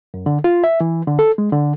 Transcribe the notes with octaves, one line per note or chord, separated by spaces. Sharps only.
F#2
D3
F4
E5
E3
D3
A4
G#3
D3